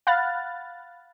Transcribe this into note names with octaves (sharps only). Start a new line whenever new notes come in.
F5 F#5 B5 F6 F#6 A6